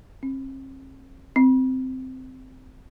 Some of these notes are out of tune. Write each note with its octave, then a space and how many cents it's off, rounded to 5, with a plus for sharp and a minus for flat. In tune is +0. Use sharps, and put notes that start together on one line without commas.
C4 +45
C4 -10